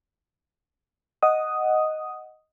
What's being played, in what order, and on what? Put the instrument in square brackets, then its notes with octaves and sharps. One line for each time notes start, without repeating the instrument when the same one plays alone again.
[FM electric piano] D#5 F#5 D#6